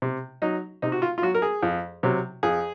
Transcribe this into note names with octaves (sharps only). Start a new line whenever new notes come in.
C3
F#3 D#4
C3 D#4
F#4
F4
F4
F#3 F#4
A#4
G#4
F2
C3 F#3
F2 G#4